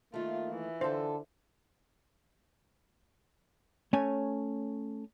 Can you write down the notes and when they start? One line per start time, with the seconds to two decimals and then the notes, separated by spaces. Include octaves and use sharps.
0.14 D#3 A3 A#3 F4
0.50 E3
0.81 D3 F4 A4 C5
3.93 A3 C#4 C#5 G#5